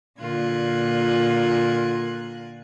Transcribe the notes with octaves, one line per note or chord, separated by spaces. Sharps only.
A#2 D3 F4 A#4 F#6 G#6